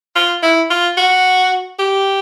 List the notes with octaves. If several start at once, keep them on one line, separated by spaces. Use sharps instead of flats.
F4
E4
F4
F#4
G4